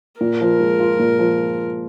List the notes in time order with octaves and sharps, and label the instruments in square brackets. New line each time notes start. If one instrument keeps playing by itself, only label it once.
[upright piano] A#2 [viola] A#4
[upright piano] F3
G#3
F4
A#2
F3